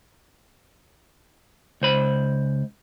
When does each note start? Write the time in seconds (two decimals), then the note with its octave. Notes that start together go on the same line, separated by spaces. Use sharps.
1.82 C#2 C5 B5